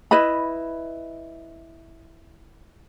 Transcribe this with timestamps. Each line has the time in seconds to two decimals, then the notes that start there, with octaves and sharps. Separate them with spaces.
0.11 E4 B4 D#5 B5